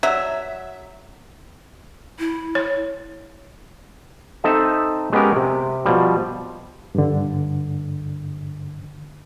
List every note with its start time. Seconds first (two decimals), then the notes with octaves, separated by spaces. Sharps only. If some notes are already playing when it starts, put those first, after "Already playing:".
0.03 F#3 E5
2.19 E4
2.55 C#5
4.44 C4 D#4 A4 E5
5.13 G#3 B3 C#4 G4 A#4
5.36 C3
5.86 B2 F3 G3
6.95 G2 D3